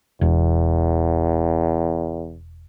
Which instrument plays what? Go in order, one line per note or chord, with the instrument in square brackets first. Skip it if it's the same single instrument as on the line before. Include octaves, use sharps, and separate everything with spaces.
[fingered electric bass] E1 [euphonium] E2